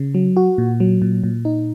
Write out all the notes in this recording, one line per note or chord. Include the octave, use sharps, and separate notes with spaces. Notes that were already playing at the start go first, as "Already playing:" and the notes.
Already playing: C#3
F#3
F#4
A#2
F#3
A#2
A#2
D#4